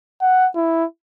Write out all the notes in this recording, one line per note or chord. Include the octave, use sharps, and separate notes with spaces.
F#5
E4